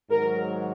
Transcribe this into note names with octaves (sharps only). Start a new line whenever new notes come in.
G#2 D#3 F#3 A#4